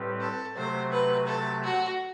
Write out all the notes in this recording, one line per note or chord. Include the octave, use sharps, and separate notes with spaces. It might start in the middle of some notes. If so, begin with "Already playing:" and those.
Already playing: A2 G3 C4 G4 B4
A4
C3 F#3 A3 C5
B4
A4
F#4